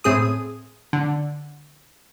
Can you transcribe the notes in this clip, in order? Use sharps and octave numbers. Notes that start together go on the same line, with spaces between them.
A2 C4 G#4 D#6
D3